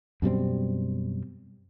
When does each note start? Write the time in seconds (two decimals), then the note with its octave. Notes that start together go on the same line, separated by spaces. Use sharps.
0.22 F#2 B2 G3 C4